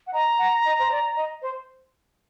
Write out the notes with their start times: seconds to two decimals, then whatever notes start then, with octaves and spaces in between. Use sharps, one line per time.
0.07 F#5
0.13 D#5 A#5
0.38 F#5
0.65 D#5
0.79 C5
0.91 D5
1.17 D#5
1.42 C5